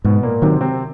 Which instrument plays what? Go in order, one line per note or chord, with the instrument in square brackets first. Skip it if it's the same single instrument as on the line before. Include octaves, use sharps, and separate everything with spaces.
[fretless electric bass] G#2 [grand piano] B2 B3
[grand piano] A#2 A#3
[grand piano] C3 C4 [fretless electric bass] D#3 F#3
[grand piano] C3 C4